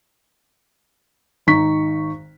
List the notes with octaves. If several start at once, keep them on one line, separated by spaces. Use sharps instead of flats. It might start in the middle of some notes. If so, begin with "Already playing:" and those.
G#1 D#3 D#4 C#6 B6